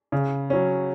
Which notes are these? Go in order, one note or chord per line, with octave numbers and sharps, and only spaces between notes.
C#3
F#3 C#4